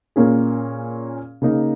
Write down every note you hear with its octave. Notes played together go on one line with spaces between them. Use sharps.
A#2 A#3 C#4 G#4
C#3 A#3 D#4